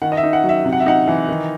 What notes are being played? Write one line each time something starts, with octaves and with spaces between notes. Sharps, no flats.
D#3 F#5
D#5
E5
D#4
F#5
F#3
E5
C3
F#5
E5
D#4 F#5
E3
D#3